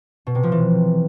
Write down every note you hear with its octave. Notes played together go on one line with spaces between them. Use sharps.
B2
C3
F3
E3